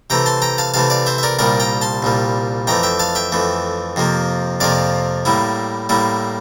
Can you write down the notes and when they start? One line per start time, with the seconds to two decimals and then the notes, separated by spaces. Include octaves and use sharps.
0.10 C3 E3 A3 G5 A#5
0.26 A5 C6
0.42 G5 A#5
0.58 F5 A5
0.74 C3 E3 A3 F5 A5
0.90 D5 F5
1.06 C5 E5
1.18 E5
1.23 A#4 D5
1.39 C2 A#2 G3 A#4 D5
1.60 G5 A#5
1.82 A5 C6
2.03 C2 A#2 G3
2.67 F2 E3 A3 G5 A#5
2.83 E5 G5
2.99 F5 A5
3.15 E5 G5
3.32 F2 E3 A3
3.96 F2 C3 F3 A#3
4.60 F2 C3 F3 A#3 D5 F5
5.25 A2 G3 A#3 E4
5.89 A2 G3 A#3 E4